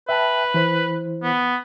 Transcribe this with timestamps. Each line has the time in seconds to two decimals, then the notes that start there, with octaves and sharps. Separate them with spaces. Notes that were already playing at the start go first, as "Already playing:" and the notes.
0.09 B4 E5 G5 A5
0.54 E3 E4 C5
1.23 B3